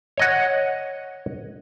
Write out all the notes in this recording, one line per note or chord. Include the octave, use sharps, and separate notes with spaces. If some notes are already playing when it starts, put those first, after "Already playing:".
C#5 D#5 F#5